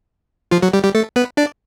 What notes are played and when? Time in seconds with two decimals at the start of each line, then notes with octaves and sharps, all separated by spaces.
0.51 F3 F4
0.62 F#3 F#4
0.73 G3 G4
0.84 G3 G4
0.95 A3 A4
1.16 B3 B4
1.37 D4 D5